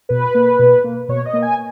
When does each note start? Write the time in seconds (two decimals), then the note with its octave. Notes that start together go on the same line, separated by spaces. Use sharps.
0.09 B2 B4
0.34 A#3
0.59 B2
0.84 A#3
1.09 B2 C#5
1.25 D#5
1.33 A#3
1.42 G#5